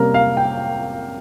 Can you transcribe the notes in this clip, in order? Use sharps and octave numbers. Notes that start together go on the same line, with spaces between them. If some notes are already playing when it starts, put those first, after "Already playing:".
Already playing: C3 G3 A#3 C#4 A#4
F5
G5